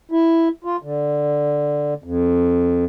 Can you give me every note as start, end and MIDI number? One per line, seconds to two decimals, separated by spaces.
0.12 0.48 64
0.65 0.77 65
0.83 1.94 50
2.04 2.85 41